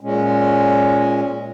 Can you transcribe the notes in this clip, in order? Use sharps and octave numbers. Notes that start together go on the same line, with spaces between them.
A#2 G#3 C#4